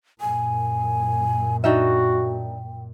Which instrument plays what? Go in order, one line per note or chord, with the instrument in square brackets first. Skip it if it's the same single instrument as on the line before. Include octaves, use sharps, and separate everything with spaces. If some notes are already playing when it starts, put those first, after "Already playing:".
[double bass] F#2 A#2 [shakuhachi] G#5
[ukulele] D4 D#4 E5 [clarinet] F#4 [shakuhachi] G5